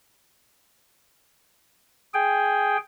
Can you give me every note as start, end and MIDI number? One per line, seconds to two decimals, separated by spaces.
2.14 2.77 68
2.14 2.77 79